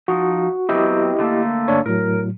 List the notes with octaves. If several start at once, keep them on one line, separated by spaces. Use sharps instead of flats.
F3 D#4 F#4
F#3 B3 C4 E4 G4 D#5
D3 A3 A#3
G1 D4 C#5
A2 F#3 A#4